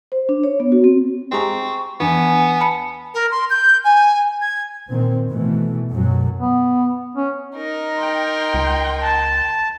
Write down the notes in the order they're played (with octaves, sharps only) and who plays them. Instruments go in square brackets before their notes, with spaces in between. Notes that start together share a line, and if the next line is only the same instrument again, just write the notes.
[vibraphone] C5
D4
C#5
B3
F#4
C4
[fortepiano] G#3 G4 A#5 [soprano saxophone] C4 [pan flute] C#6
[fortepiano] E2 D4 [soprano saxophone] B3 [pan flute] G#5
[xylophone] A5 B5 C#7
[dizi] A#4
C6
G6
G#5
G#6
[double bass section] A#2 D#3 C4
B2 E3 A3
F#2 B2 F#3
[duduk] B3
C#4
[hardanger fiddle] D#4 A#4
[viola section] G5 C6
[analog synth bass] C#2
[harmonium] A5